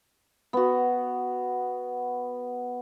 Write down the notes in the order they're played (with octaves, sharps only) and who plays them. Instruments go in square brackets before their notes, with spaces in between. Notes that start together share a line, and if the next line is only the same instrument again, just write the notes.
[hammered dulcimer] B3 F#4